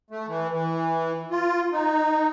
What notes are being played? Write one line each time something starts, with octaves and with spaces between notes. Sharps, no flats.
A3
E3
E3
F4
D#4